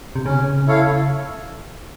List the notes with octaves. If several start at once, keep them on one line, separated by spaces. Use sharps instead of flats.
C3
C#3 C#4
E4 A4 C#5 F5